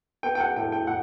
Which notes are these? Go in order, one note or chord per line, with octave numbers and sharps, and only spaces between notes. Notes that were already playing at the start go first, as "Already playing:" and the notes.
B3 G5
G5
F#5
A2 G5
G5
A2 F#5